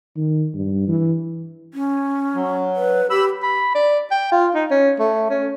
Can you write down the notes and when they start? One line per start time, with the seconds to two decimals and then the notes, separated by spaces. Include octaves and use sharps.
0.17 D#3
0.54 G2
0.88 E3
1.74 C#4
2.35 F#3
2.76 B4
3.10 G4 B5 E6
3.43 B5
3.75 D5
4.11 G5
4.31 F4
4.55 D#4
4.71 C#4
4.99 A3
5.30 C#4